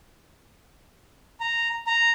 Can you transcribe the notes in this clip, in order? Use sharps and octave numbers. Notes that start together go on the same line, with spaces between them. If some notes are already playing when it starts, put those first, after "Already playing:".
A#5
A#5